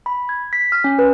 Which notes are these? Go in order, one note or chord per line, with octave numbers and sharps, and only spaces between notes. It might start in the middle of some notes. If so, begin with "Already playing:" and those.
B5
G#6
B6
F6
C#4
B4